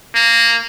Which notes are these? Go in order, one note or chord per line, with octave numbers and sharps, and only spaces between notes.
A#3